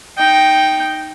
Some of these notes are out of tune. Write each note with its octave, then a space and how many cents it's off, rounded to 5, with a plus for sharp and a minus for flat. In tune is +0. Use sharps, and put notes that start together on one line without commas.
D#4 +0 G5 +0